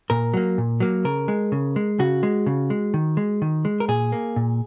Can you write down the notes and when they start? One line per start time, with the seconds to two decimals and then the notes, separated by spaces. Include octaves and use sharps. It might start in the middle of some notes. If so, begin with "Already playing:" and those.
0.10 A#2 A#4
0.34 F#3 A#3
0.58 A#2
0.80 F#3 A#3
1.05 C#3 A#4
1.28 G#3
1.52 C#3
1.76 G#3
1.99 C#3 F#4
2.23 G#3
2.46 C#3
2.70 G#3
2.94 D#3
3.17 G#3
3.42 D#3
3.65 G#3
3.80 A#4
3.88 A#2 G#4
4.12 A#3
4.36 A#2